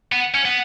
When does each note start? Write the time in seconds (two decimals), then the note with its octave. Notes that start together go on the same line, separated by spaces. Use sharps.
0.12 B3
0.34 C#4
0.45 B3